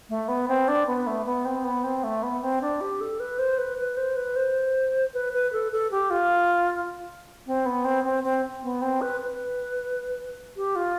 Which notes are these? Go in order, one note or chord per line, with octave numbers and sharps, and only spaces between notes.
A3
B3
C4
D4
B3
A3
B3
C4
B3
C4
A3
B3
C4
D4
G4
A4
B4
C5
B4
B4
C5
B4
C5
B4
B4
A4
A4
G4
F4
C4
B3
C4
C4
C4
B3
C4
B4
B4
G4
F4